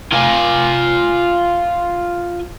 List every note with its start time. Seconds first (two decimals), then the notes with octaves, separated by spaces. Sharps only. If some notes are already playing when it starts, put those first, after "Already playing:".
0.13 F4 G#5